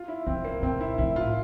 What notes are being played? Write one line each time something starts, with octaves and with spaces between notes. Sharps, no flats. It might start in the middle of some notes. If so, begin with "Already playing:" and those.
Already playing: F4
E4
D3 C4
A#3
A#2 C4
E4
A2 E4
F4